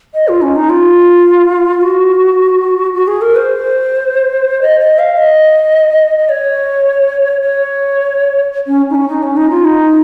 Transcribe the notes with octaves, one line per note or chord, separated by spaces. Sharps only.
D#5
F4
C#4
D#4
F4
F#4
F#4
G#4
A#4
C5
D#5
D#5
F5
D#5
D#5
C#5
C#5
C#4
D#4
C#4
D#4
C#4
D#4
F4
D#4